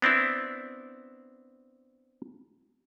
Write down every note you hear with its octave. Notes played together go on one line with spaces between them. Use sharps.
B3 C4 D4 E4